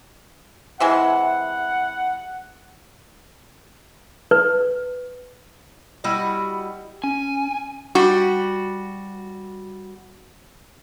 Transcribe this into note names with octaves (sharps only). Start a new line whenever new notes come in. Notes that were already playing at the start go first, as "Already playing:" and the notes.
C3 E3 G#3 F#5
B4
G3 E4 F#4 D#5
C#4 G#5
G3 F#4